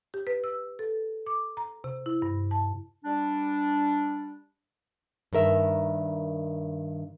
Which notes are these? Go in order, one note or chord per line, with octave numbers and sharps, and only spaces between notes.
G4
B4
E6
A4
D6
A#5
C3
E4
G2
A5
G3 D4
G2 D#3 A#4 E5